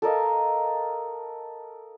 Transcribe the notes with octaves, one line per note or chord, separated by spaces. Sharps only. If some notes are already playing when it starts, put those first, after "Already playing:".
A4 A#4 D#5 F5